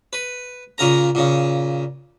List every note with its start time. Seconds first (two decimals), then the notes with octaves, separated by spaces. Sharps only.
0.13 B4
0.78 A#2 C#3 A#4 A#5
1.15 A#2 C#3